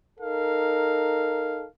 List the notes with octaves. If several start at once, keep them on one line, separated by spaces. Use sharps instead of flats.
D#4 A4 A#4 F5